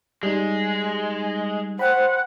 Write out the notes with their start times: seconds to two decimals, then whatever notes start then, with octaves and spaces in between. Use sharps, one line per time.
0.23 G3 G#3 D#4
1.79 C5 F#5 G5 B5